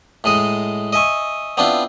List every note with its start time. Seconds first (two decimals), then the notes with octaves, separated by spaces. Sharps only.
0.24 A2 G#3 D#5
0.93 D#5 E5 G#5 C#6
1.57 B3 C4 D4 E4 F4